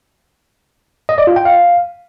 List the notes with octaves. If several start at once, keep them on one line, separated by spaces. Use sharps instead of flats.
D#5
D5
F4
G5
F5